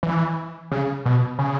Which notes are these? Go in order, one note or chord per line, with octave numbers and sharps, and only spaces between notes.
E3
C#3
B2
C#3